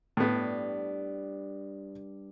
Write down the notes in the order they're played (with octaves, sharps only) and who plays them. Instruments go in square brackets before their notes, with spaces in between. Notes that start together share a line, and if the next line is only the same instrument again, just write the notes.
[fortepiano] A2 B3
[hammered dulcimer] G2